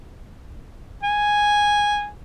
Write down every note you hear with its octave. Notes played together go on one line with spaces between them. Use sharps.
G#5